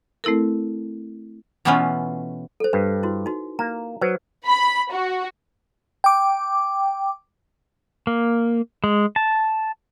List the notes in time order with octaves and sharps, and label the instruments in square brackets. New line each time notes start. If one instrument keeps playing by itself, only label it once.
[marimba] A3 C4 E4 A4 A#4
[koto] B2 E3 A3 B3 C#4 F4
[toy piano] A4 C5
[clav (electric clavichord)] G2 [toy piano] B4
[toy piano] E4 F#4
D#4 F#4
[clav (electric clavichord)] A#3 [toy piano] A#5
[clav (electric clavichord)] F#3 [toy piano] B4 C5
[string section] B5
F#4
[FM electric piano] G5 D6
[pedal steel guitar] A#3
G#3
A5